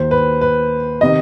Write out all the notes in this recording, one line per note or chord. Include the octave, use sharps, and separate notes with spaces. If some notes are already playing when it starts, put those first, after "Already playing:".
Already playing: D#2 D#3 C5
B4
B4
C3 D#3 D#5